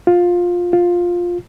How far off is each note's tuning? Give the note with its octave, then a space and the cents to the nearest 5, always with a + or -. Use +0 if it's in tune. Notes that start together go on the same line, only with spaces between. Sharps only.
F4 +15
F4 +10